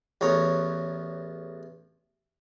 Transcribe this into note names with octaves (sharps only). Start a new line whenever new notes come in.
A1 E2 C#5 A#5